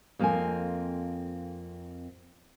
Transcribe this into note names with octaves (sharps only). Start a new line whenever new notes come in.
F2 A#3 C4 A4 G#5